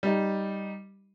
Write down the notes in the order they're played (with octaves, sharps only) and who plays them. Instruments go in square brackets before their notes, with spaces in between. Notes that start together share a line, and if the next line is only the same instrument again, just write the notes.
[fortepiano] G3 D#4